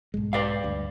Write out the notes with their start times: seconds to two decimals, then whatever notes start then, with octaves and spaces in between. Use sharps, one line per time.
0.14 B1 G#2 G#3
0.33 B4 D5 F5
0.63 D2 G2